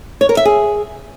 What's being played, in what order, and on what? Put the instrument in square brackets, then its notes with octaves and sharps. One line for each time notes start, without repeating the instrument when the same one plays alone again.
[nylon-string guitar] C#5
A#4
E5
G#4